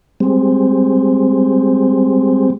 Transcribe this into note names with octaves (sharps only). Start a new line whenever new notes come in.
G3 G#3 C4